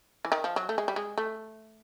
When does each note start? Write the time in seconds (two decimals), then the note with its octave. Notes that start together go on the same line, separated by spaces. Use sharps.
0.25 E3
0.32 D#3
0.44 F3
0.56 F#3
0.69 A3
0.78 G#3
0.88 G3
0.96 G#3
1.18 A3